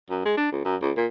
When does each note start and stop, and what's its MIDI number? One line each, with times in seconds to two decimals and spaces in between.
0.10 0.24 42
0.25 0.32 56
0.37 0.52 62
0.52 0.64 37
0.65 0.75 42
0.82 0.92 37
0.97 1.06 46